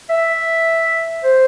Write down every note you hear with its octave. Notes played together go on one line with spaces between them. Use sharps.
E5
C5